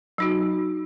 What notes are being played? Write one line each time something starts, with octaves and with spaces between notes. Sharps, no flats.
F#3 D#4 F#4